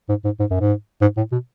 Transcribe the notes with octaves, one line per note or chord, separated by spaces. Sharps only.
G#2
G#2
G#2
F#2
G#2
G#2
A2
B2